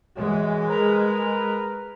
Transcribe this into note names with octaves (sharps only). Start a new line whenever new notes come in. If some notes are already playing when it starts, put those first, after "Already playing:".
F#2 E3 G#3
A#4 B4 A#5